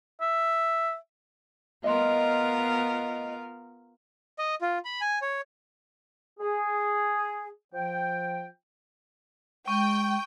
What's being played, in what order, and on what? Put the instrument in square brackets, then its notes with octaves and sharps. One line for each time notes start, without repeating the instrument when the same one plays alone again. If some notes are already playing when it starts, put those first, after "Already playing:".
[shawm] E5
[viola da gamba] B3 F4 A#4 [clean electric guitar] D#5 C6
[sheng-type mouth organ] D#5
F4
B5
G#5
C#5
[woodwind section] G#4
F3 G5
[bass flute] G#3 [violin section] G5 [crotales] C#6